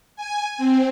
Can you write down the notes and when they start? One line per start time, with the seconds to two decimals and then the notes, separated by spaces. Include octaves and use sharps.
0.16 G#5
0.58 C4